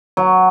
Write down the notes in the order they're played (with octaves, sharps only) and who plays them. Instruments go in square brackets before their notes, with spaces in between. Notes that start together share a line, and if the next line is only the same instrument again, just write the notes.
[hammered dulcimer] F#3